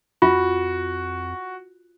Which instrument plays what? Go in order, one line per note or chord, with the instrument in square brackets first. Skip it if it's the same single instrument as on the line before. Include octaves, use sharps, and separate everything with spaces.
[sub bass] F2 [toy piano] F4 [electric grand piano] F#4